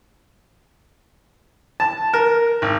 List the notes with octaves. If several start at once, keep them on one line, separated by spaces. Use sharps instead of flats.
A5
A#4
G#1